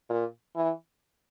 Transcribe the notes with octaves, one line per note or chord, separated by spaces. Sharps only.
A#2
E3